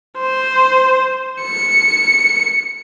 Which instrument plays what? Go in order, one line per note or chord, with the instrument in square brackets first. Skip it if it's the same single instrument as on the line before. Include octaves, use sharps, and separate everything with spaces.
[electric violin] C5
C#7